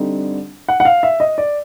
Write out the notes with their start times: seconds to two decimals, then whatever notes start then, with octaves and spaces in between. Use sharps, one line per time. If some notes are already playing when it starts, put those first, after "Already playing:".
Already playing: D3 G3 C4 D#4
0.68 F#5
0.80 F#5
0.85 F5
1.03 E5
1.20 D#5
1.38 D5